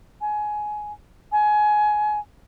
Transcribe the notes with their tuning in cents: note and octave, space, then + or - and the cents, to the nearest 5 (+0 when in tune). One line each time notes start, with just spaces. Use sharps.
G#5 +20
G#5 +20